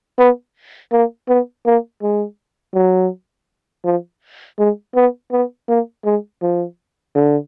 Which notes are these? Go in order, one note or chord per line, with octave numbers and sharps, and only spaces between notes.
B3
A#3
B3
A#3
G#3
F#3
F3
G#3
B3
B3
A#3
G#3
F3
D3